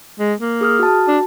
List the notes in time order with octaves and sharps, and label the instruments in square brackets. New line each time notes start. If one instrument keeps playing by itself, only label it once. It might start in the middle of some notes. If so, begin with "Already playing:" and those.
[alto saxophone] G#3
A#3
[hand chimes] G#4 D#6 F6
F#4 A5
[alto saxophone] D4